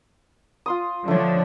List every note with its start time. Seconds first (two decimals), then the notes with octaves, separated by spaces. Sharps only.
0.66 F4 C6 D#6
1.08 D3 F3 A3 D4 C#5